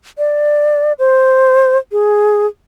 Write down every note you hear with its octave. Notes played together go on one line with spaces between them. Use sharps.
D5
C5
G#4